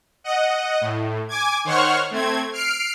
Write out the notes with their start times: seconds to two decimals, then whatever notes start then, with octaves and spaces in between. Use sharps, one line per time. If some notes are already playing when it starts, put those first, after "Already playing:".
0.24 D#5 F#5
0.81 A2
1.29 G#5 D6 G#6
1.65 D#3 C5 C#5 F#5 C#6 F6
2.11 A3 C4 G#6
2.53 F6 C7 D7